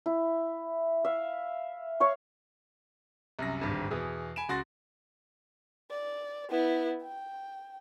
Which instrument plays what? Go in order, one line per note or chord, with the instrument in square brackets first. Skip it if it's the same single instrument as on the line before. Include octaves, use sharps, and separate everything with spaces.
[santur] E4
E5 F5
C#5 F5 C#6
[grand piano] C2 F#2 A#6
D1 G#1 G2
E2 B2 G#4
G#5 B5 D7 E7
C#2 F#4 C6 A6 A#6
[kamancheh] D5
B3 E4
G5